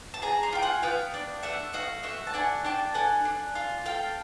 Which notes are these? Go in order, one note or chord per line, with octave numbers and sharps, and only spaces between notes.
A5
G#4 G#5 A#5
A#5 C6
F4 G5
F#5 G#5
B3 F5 G5
D4
A3 E5 F#5
F#4 D#5 F5
A3 E5 F#5
A5
D4 F#5 G#5
D4 G5 A5
A4 F#5 G#5
D4
F4
A4 F5 G5